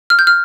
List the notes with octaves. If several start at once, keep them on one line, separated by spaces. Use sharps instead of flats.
F6
G6
F6